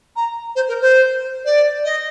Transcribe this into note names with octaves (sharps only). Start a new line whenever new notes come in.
A#5
C5
A#4
C5
D5
D#5